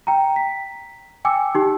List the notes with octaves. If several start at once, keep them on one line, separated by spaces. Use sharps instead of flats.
G5 A#5
B6
G5 G#5 D6 E6 C#7
D#4 G4